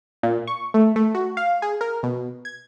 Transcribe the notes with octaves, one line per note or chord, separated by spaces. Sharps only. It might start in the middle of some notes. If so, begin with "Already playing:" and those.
A#2
C#6
A3
A3
F#4
F5
G#4
A#4
B2
G#6